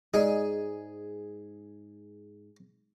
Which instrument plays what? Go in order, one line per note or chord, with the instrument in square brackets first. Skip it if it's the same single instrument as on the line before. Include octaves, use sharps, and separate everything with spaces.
[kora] G#2 [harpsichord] G#4 [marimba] D5 D#5